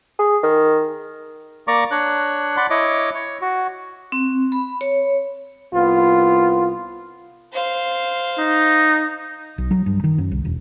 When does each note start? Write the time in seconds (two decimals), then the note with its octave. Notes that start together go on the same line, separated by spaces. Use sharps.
0.19 G#4
0.43 D#3
1.68 A#3 D5 A#5 C#6 D6
1.91 D4 C#5 F#6
2.57 D5 F#5 B5 C6
2.70 E4 C#5 D#5 D6
3.15 C#5
3.42 F#4
4.12 C4
4.52 B5
4.81 C#5
5.74 C2 B3 F4
7.53 C5 F5
8.38 D#4
9.58 B1
9.71 F#3
9.86 G2
10.04 D#3
10.18 F#2
10.32 C2
10.45 E1